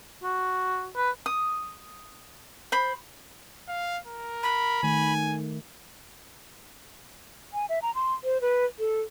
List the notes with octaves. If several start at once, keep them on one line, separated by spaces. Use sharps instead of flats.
F#4
B4
D#6
C5 B5
F5
A#4
B5
D#3 A3 G#5
G#5
E5
A#5
C6
C5
B4
A4